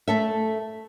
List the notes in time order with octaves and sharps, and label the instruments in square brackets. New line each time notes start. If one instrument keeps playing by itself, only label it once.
[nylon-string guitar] A3 A4 E5